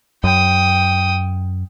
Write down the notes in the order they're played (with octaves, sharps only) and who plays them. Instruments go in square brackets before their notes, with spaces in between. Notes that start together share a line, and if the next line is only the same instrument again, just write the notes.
[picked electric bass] F#2 [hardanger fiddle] G5 D#6